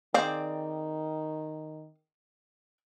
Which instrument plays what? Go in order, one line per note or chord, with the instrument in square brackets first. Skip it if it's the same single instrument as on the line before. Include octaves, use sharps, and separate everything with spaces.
[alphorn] D#3 [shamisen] C4 F5 [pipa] G#4 D5